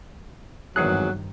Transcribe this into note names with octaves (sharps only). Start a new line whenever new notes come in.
G#1 E2 G2 C3 D#3 F#3 G#4 F#6